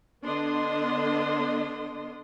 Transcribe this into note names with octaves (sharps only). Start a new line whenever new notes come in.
D3 B3 D4 D#5 C6